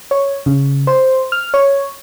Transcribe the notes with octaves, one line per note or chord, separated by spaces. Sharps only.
C#5
C#3
C5
F6
C#5